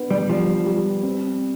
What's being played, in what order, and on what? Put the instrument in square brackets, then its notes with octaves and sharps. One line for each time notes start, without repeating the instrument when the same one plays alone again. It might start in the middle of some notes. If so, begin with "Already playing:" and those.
Already playing: [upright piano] B3 D4
[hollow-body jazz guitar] G3
[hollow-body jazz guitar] F3 [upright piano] G3
[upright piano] G3
C4